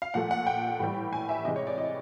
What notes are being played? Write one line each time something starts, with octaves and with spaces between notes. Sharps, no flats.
F5
A#2 F3 A3 F#5
F#5
G5
A2 E3 G3
G#5
E5
C3 E3 G#3 D#5
C#5
D5
D#5